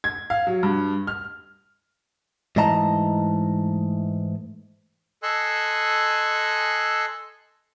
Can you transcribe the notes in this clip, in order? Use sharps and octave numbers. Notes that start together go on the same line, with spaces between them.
G#6
F5
F#3
G2
F6
G#2 E3 A3 D#5 A5 A#5
A4 D#5 G#5 C6 E6 F#6